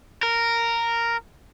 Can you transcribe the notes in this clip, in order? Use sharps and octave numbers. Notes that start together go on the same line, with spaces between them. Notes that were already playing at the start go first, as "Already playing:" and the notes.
A#4